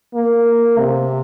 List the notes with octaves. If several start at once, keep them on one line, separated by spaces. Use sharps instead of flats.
A#3
C3